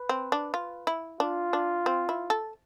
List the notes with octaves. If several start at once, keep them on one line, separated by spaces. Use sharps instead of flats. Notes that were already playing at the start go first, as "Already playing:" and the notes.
Already playing: B4
C4
D4
F4
E4
D4 F4
D4
C4
E4
A4